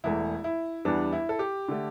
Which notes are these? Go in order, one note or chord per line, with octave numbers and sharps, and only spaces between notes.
E1 E2 E3 A3 E4
E4
E2 E3 G3 B3 D4
E4
A4
G4
D3 A3